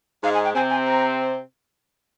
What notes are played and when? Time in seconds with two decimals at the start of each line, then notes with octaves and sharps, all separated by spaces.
0.23 G#2 G#3 F5
0.34 G#5
0.45 G5
0.55 C3 C4 G#5
0.70 G#5
0.86 A#5